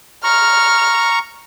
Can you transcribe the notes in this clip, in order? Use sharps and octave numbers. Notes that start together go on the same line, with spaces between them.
A#5 C#6 F6